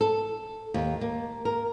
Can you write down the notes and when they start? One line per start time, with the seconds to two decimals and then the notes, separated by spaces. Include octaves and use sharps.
0.01 A4
0.74 D#2
1.01 A#3
1.45 A#4